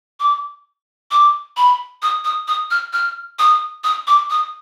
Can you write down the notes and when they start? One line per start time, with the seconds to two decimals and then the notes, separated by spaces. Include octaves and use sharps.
0.20 D6
1.11 D6
1.57 B5
2.02 D#6
2.25 D#6
2.48 D#6
2.71 F6
2.93 F6
3.39 D#6
3.84 D#6
4.07 D6
4.30 D#6